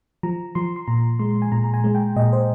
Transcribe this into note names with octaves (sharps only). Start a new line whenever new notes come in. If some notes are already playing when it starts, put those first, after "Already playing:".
F3 A#5
F3 C6
C6
A#2 A#5
G#3 C6
G#5
A#2 A#5
A#5
G#5
G#3
G5
A#2 D#5
C5